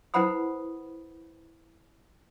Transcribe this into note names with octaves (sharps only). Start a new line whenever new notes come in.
E4 B4 C5 F#5 B5 D#6